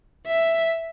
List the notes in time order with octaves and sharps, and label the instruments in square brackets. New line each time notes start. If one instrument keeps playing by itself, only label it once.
[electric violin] E5